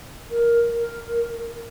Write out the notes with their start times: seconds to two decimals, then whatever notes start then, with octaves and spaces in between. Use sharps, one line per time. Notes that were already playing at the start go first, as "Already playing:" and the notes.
0.31 A#4
0.73 A#4